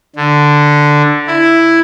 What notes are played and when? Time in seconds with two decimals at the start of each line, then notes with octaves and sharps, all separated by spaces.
0.16 D3
1.27 E4